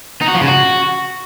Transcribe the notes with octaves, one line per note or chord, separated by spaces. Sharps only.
D#4
F#4
F3
C#3
F#4